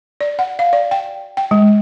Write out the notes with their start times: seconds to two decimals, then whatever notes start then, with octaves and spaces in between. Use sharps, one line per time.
0.21 D5
0.39 F#5
0.59 F5
0.73 D5
0.91 G5
1.37 G5
1.51 G#3